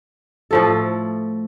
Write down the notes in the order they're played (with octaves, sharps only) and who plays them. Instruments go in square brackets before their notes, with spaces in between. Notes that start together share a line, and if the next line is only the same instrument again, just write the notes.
[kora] A2 F3 A4